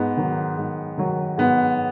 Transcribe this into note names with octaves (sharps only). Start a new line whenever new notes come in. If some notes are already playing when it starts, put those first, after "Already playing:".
Already playing: G#2 B3
D#3 F#3
G#2
D#3 F#3
G#2 B3